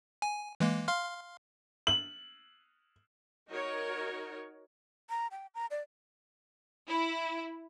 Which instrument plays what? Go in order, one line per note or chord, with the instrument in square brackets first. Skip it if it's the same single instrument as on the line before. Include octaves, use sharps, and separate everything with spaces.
[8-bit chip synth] G#5
E3 G#3 A#3
F5 C6 F6
[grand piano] F#7
[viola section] D#4 F#4 A#4 C#5
[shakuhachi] A#5
G5
A#5
D5
[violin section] E4